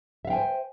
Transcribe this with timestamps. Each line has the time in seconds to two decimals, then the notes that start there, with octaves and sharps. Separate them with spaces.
0.25 E5
0.27 F5
0.30 G5
0.33 G#5
0.36 C5